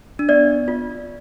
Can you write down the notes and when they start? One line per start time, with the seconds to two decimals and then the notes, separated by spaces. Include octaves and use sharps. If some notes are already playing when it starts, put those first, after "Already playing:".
0.19 D4
0.29 B3 D5
0.68 F4